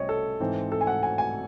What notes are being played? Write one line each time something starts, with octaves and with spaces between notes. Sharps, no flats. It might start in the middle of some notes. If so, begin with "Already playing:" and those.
Already playing: C2 C3 C#4 C#5 D#5
A4
G#2 E3 C4
A4
G#5
F#5
G#5
G#5